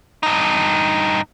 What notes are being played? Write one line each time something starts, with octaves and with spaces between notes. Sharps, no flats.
G2 D#4